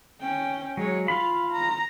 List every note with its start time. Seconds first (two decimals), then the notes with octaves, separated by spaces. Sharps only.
0.21 C#4 G5
0.77 F#3 G#3 C#5
1.08 F4 F5 B5
1.52 A#5